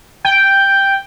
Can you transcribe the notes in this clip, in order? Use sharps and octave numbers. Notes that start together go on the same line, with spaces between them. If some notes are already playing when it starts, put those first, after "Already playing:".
G5